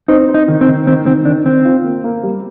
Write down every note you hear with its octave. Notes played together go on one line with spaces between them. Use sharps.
C4 D#4
C4
D#4
D#3
C4
D#3
D#3 C4
D#3 C4
D#3 D4
D#3 C4
F4
A#3
A#3
G3